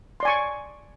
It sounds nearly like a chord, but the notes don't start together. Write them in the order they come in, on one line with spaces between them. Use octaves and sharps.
C6 D5 G#5 C#6